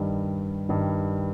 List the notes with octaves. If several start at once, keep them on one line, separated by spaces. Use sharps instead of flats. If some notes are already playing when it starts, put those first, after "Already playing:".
Already playing: G2 D#3 G3
G2 D#3 G3